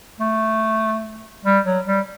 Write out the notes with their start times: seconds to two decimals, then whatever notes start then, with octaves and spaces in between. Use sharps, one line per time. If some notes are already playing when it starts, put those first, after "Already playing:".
0.20 A3
1.45 G3
1.65 F#3
1.86 G3